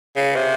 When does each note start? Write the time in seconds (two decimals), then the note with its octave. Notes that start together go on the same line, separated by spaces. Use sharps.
0.16 C#3
0.36 C3